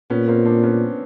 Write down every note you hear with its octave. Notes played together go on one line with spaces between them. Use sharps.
A#2 B3 C#4
A#3 C4
C4 D4
B3 C#4